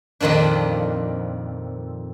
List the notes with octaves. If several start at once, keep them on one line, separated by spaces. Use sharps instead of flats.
F2 A#2 D#3 F3 D4